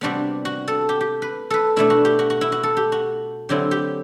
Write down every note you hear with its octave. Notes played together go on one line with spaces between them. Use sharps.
C3 G3 B3 D4 F#4
F#4
A4
G4
G4
B4
A4 B4
B2 A3 D4 E4
F#4
G4
F#4
F#4
E4
F#4
A4
G4
F#4
D3 F#3 C4 E4 G4
G4